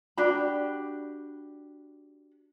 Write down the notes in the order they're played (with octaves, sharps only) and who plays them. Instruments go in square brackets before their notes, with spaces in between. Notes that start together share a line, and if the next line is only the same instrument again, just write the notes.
[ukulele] D4 F#4 G4 B5